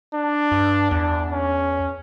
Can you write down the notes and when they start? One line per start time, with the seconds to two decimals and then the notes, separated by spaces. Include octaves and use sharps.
0.14 D4
0.52 G2
0.91 E2 D4
1.32 C#4